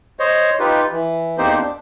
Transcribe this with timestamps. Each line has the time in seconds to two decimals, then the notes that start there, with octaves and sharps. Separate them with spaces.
0.20 C5 C#5 D#5
0.60 D#4 F4 G4 B4
0.92 E3
1.38 E2 A#3 C4 D#4 G4 C5
1.57 D4